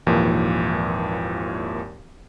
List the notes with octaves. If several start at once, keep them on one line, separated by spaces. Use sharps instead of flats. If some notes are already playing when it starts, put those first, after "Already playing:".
G#1 D#2 A#2 E3 F3